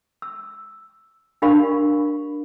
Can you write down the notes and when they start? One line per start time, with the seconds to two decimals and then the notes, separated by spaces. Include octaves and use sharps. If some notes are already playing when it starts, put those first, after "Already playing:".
0.22 E6
1.42 D4 G4 A#4 D5 F5 B5